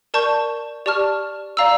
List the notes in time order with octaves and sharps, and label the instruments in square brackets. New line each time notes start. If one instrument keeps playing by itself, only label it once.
[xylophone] A#4 D5 A5 C#6 G6
G4 D5 A5 C#6 F6
D5 F5 A#5 E6